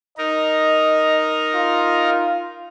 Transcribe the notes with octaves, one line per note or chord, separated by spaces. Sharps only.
D#4 A#4 D#5
F4